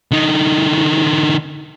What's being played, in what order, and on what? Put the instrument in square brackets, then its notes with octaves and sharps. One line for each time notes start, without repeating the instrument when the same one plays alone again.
[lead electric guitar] D3 D#4